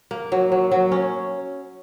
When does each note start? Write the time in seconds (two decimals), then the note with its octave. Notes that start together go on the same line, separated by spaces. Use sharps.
0.11 A#3
0.32 F#3
0.52 F#3
0.72 F#3
0.92 C#4